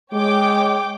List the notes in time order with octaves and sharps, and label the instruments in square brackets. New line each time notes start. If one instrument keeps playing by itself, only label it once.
[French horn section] G#3 [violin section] C#5 G5 D6